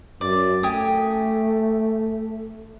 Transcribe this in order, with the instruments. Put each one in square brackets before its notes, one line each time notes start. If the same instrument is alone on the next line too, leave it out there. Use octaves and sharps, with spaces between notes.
[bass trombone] F#2 [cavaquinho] D5
[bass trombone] A3 [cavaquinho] G4 G#5 D#6